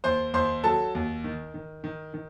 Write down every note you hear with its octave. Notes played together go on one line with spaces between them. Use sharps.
D#2 C5 C6
D#2 C5 C6
F#3 A4 A5
D#2
D#3
D#3
D#3
D#3